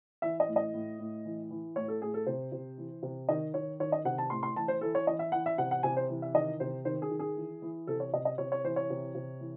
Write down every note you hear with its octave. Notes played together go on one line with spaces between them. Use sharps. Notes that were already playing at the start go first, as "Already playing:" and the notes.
E3 E5
D#5
A2
D#5
A2
A2
E3
E3
A2 C#5
A4
A2 G#4
A4
C3 C5
C3
E3
C3
D#3 D#5
D#3 C#5
D#3 C#5
D#5
C3 F#5
A5
A2 C6
C6
E3 A5
C5
E3 A4
C#5
E3 D#5
E5
E3 F#5
E5
C3 F#5
F#5
C3 G#5
C5
E3
E5
D#3 D#5
C3 C5
D#3 C5
G#4
D#3
G#4
E3
E3
C3 A4
C#5
C3 D#5
D#5
C3 C#5
C#5
E3 C5
C#5
C3
C3
E3